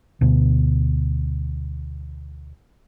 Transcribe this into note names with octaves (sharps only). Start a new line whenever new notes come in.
D2 B2